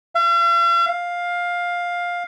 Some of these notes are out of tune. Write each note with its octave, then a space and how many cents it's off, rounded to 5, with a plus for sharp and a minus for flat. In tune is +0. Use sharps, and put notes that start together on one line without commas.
F5 -45
F5 +10